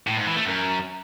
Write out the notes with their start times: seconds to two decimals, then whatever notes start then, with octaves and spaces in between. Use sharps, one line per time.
0.07 A2
0.17 G#2
0.26 E3
0.36 A3
0.46 F#2